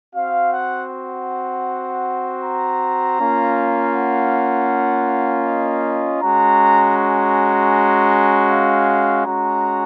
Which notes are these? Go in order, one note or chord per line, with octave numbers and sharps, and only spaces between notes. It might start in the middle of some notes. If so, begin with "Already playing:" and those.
C4 F#4 F5
F#5
F#5
A#5
A#3 C#4 F4
F#5
D#5
G#3 C#4 F#4 A#5
A#5
F5
G#3 C#4 F#4 A#5